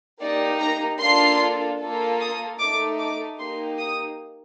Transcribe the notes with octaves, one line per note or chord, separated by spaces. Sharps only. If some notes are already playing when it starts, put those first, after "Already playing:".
A#3 D#4 G4 D5
A#5
A#3 D4 F4 A4 C6
A#3 F4 A4
D#6
A3 D#4 A4 D6
D6
A#3 D#4 G4 C6
D#6